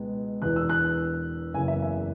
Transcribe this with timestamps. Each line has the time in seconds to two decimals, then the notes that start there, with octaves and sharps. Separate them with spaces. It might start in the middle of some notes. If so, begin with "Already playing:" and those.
Already playing: C#2 B2 G#3 B3
0.42 E1 E2 E3 B3 F#6
0.56 E6
0.69 F#6
1.54 F#1 E2 C#3 G#5
1.68 E5
1.82 E5